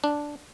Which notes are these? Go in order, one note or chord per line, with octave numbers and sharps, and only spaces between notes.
D4